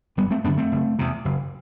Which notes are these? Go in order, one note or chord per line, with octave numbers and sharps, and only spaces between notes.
G1 G3 B3
A3 C4
F#2 D3 B3 D4
A3 C4
F#1
E2 C3
F#1